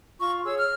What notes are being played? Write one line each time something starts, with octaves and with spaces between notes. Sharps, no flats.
F4 C#6
G#4 C#5 E6
F6